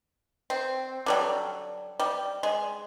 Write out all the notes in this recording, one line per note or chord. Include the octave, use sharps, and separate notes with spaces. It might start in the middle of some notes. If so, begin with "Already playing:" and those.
C4
D3 F#3 G3
G3
G#3